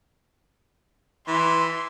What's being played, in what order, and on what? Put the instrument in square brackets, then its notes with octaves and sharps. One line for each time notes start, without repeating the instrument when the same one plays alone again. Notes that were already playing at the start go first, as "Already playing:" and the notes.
[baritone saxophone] E3 [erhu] C6